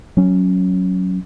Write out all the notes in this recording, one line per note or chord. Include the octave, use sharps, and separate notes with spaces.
F#3 C#4